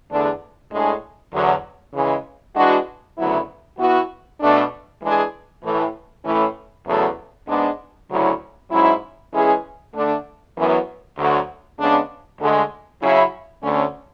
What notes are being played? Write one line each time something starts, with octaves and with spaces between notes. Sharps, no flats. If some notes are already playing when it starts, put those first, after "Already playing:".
E2 D3 A3 D4 G#4
A2 G#3 D4 G#4
E2 D3 F#3
C#3 E3 G#3
E3 G#3 D4 F#4
D2 C#3 F#3 B3 E4
E3 B3 F#4
B2 A3 D4
E3 G#3 D4 G#4
A2 E3 A3
A2 E3 A3 C#4 E4
E2 C#3 F#3 A3
G#2 G#3 B3 D4
D2 C#3 F#3 C#4 E4
G#2 F#3 C#4 E4
E3 G#3 C#4 E4 G#4
D3 A3 D4
F#2 E3 B3
D2 D3 F#3
C#3 G#3 B3 D4
D2 D3 G#3
C#3 F#3 C#4 E4
D2 D3 A3 C#4